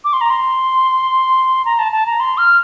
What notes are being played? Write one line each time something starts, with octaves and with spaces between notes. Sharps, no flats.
D6
C6
A#5
C6
A#5
A5
A5
A#5
C6
F6